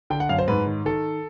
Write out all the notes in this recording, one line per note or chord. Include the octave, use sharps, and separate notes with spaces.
D3 G5
F#5
F#2 F5
C5
G#2 B4
D#3
D#3 A4